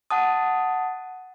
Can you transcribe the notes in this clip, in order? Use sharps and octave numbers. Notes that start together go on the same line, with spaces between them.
F#5 A5 D#6